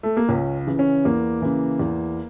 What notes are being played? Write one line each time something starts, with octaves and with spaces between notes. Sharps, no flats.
A3
A#3
C#2 C#4
C#3 E3
C#4
E2 A#3
C#3 E3
E2